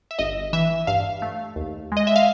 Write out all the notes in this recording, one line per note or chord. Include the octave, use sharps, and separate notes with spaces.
E5
G1 D#5
E3 E5
G2 F5
A3
D#2
G#3 D#5
E5
F5